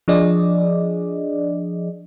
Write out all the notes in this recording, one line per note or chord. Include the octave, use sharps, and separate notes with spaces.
F3 D4 G#4 D5 D#5